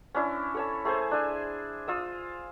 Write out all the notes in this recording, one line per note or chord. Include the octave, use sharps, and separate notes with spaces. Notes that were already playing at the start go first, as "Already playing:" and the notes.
C#4 D4 E4 C6
A4 C#5 A5
A3 G#4 C5
D4 E5 G#5
F4 D#6 E6